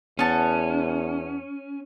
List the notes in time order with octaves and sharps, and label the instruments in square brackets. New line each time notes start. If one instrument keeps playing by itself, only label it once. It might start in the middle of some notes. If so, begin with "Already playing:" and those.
[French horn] E2 [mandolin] B3 A5 [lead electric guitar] C#4